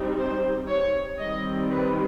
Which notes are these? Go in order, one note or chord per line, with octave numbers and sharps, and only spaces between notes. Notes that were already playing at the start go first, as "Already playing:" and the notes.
Already playing: G3 C4 D#4
C5
C#5
D#3 G3 C4 D#5
B4